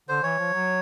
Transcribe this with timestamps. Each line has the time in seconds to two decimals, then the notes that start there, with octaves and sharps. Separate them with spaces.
0.09 D3 C5
0.23 E3 C#5
0.39 F3
0.53 F#3